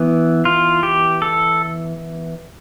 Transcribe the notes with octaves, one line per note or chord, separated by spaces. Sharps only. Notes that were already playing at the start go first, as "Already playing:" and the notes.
Already playing: E3 B3
F4
G4
A4